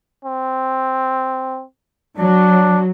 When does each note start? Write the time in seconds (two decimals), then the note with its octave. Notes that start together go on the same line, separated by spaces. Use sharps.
0.25 C4
2.18 F#3 D4